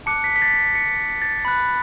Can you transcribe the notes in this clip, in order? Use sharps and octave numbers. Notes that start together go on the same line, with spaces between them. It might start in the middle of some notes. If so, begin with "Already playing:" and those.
A5 D6 F#6 C#7
B6
B6
A6
B6
C#7
A6
B5 F#6